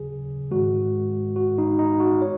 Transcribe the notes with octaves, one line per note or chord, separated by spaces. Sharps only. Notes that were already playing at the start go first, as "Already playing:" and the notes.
Already playing: D#2 C#3 F#3 G#4
G#2 D#3 G#3 F#4
F#4
D#4
D#4
F#4
C#5